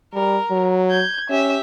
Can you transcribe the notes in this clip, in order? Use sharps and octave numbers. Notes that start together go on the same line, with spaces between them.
G3 A#4
F#3
G6 G#6
C#4 G4 E5